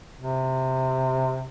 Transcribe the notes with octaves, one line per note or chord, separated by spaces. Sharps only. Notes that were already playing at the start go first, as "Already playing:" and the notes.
C3